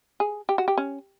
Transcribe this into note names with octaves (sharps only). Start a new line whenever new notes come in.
G#4
G4
F#4
G4
C#4